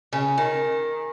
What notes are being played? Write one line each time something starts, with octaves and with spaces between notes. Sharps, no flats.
C#3
D#3